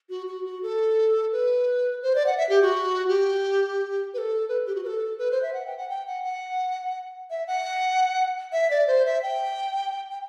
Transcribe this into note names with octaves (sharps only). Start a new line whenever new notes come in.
F#4
F#4
F#4
A4
B4
C5
D5
F#5
E5
G4
F#4
G4
B4
A4
B4
G4
F#4
B4
A4
B4
C5
E5
F#5
G5
F#5
G5
F#5
F#5
E5
F#5
E5
D5
C5
E5
G5
G5